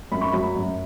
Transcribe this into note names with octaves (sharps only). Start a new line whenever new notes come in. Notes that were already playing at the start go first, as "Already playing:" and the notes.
F#2 B5
C#6
F#3 B5
F#2